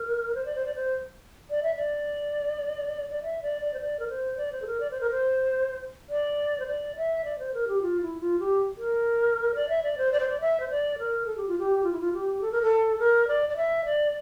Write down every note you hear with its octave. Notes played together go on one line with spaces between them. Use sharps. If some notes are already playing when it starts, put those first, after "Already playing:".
Already playing: A#4
C5
D5
C5
D5
C5
D5
E5
D5
D5
E5
D5
D5
C5
D5
A#4
C5
D5
C5
A4
A#4
D5
C5
A#4
C5
D5
C5
D5
E5
D5
C5
A#4
G4
F4
E4
F4
G4
A#4
D5
E5
D5
C5
D5
C5
D5
E5
C5
D5
A#4
A4
G4
F4
G4
F4
E4
F4
G4
A4
A#4
A4
A#4
D5
D5
E5
D5